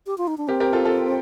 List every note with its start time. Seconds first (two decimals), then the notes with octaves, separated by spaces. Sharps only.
0.07 G4
0.18 F4
0.27 D#4
0.38 D4
0.48 C4 G4 A#4
0.60 G4 A#4
0.73 F4 A4
0.85 F4 A4